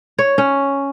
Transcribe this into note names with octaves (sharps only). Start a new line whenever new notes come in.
C#5
C#4